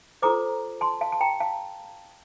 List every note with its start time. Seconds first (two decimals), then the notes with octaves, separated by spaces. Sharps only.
0.22 F4 A4 C5 A#5 D6
0.81 A5 C6
1.01 F5 A5
1.12 A5
1.21 G5 A#5
1.40 F5 A5